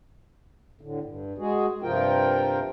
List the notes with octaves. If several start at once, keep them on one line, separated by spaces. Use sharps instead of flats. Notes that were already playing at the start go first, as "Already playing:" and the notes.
A2 D3
G2
G#3 F#4 G#4
G2 C3 F3 F4 A#4 G5